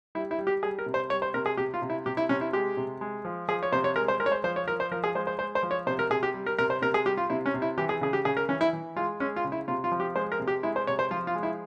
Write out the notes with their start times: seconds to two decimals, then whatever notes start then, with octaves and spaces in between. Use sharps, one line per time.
0.15 G3 E4
0.31 E4
0.39 G3
0.47 G4
0.63 G3 G#4
0.79 A#4
0.86 C3
0.94 C5
1.10 G3 C#5
1.22 C5
1.34 C3 A#4
1.46 G#4
1.57 C3 G4
1.74 F4
1.82 C3
1.90 E4
2.06 C3 G4
2.17 E4
2.29 C3 C#4
2.41 E4
2.53 G#3 G4
2.77 C3
3.01 G#3
3.25 F3
3.49 F3 G#4
3.63 C#5
3.72 C3 C5
3.84 C#5
3.96 G#3 A#4
4.08 C5
4.20 G#3 A#4
4.26 C#5
4.32 C5
4.44 F3 C5
4.56 C#5
4.67 F3 A#4
4.80 C5
4.91 F3 A#4
5.04 G#4
5.15 G#3 C5
5.27 C5
5.39 G#3 C5
5.55 C5
5.63 F3
5.71 C#5
5.87 C3 C5
5.99 A#4
6.10 C3 G#4
6.23 G4
6.34 G3
6.46 A#4
6.58 C3 A#4
6.70 C5
6.82 C3 A#4
6.94 G#4
7.06 G3 G4
7.17 F4
7.30 C3 E4
7.46 C#4
7.54 C3
7.62 E4
7.78 E3 G4
7.89 G#4
8.01 C#3 G#4
8.13 G4
8.25 C#3 G#4
8.37 A#4
8.49 E3 C#4
8.61 E4
8.73 E3
8.96 G#3 F4
9.20 G#3 C#4
9.36 F4
9.45 C#3
9.52 E4
9.68 C3 F4
9.84 F4
9.92 F3
10.00 G4
10.16 G#3 C5
10.32 A#4
10.40 C3
10.48 G4
10.63 G#3 E4
10.76 C5
10.87 C3 C#5
10.99 C5
11.11 F3 F4
11.27 F4
11.35 G#3
11.43 E4